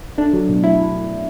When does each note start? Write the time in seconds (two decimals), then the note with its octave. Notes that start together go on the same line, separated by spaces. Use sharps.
0.18 A3 D4
0.33 F#3
0.49 B2
0.64 F#3 E4